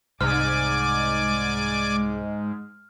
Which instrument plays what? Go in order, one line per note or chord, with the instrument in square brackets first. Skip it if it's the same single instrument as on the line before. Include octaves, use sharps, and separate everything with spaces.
[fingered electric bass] C2 [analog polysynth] G#2 [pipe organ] D5 G#5 D6 [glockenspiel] F6